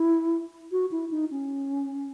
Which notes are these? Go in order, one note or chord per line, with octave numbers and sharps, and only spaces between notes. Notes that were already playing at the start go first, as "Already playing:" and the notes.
Already playing: E4
F#4
E4
D#4
C#4